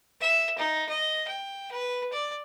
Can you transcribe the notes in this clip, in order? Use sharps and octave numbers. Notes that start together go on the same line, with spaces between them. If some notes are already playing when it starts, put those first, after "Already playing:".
E5
D#4
D#5
G5
B4
D5